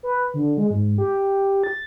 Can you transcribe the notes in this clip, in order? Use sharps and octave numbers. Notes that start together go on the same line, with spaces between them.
B4
D3
G#3
G#2
G4
A6